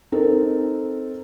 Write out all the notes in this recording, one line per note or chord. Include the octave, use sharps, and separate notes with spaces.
C4 D#4 A4 A#4